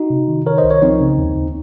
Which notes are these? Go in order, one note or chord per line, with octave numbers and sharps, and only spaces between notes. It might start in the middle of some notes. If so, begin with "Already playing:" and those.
Already playing: D#4 F#4
C3
D#3
D#3 A#4 C#5
C5 D#5
C2
A#4 C#5
F3 C4 D#4
C#3
D#2
D#2